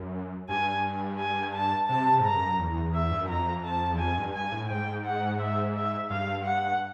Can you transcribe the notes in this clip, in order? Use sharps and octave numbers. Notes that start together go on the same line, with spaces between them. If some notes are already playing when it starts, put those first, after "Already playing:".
Already playing: F#2
G2 G#5
G#5
A5
C3 A5
C3
G#2
G2 A#5
F#2
E2
E5
G2
F#2
F2 A#5
A5
E2
F2 G#5
G2
G2 G#5
A2
G#2 G5
F#5
E5
E5
G2 F5
F#5